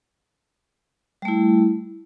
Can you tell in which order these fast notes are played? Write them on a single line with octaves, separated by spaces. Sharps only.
G3 A3 E4